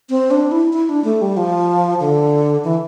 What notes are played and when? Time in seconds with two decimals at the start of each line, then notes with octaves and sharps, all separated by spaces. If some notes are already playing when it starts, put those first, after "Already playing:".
0.10 C4
0.31 D4
0.51 E4
0.73 E4
0.89 D4
1.04 A3
1.21 G3
1.37 F3
2.00 D3
2.64 E3